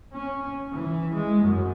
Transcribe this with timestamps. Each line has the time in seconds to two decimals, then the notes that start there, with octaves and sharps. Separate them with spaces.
0.14 C#4
0.73 E3
1.14 G#3
1.43 F#2